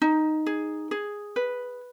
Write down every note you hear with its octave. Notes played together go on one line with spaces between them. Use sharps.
D#4
G#4
G#4
B4